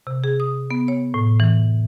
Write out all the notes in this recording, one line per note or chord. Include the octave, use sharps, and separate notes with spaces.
C3
G#4
D#6
B3
C#5
A2
E3